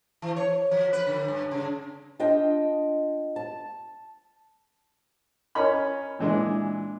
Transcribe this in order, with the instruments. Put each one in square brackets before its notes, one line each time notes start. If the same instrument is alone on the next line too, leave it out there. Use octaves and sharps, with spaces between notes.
[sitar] E3
C#5
F3
B4
D3
G2
C#3
[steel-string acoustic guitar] D4 F4 D#5 G5
A5
[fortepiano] C#4 A#4 D#5 B5
A#2 E3 G#3 D4